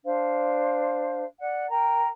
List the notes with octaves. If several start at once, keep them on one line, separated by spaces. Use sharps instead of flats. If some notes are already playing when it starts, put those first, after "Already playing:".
D4 C5 F5
D5 F#5
A#4 G5 A#5